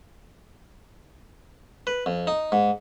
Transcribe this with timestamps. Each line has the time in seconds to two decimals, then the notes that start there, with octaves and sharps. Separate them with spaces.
1.87 B4
2.06 F2
2.27 D#4
2.52 G#2